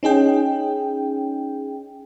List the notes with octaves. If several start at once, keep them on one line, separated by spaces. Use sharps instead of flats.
C#4 D#4 G#4 G5